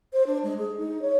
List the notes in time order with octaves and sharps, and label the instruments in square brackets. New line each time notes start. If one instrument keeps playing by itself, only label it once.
[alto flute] C5
D4
G#3
G#4
D#4
C#5